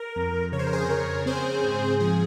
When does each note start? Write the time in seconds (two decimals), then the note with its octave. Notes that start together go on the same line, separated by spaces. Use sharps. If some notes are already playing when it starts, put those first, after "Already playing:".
Already playing: A#4
0.16 F2
0.52 C#3 C#5
0.59 C5
0.67 A#4
0.73 G#4 C5
0.89 C#3 A#4 C#5
1.26 C4 G#4 C5
1.64 G#2
2.00 F3 G#4